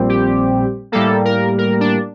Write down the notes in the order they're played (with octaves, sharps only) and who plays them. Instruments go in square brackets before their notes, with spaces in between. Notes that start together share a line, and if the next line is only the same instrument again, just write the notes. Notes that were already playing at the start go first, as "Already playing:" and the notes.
Already playing: [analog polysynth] A#1 A#2 G3 C4
G4
A2 G3 A#3 A4
A#4
A#4
D4